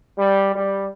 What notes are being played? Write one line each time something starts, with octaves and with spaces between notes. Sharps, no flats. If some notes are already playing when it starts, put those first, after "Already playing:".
G3
G3